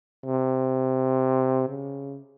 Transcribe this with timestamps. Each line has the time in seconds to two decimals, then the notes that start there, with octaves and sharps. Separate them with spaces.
0.24 C3
1.68 C#3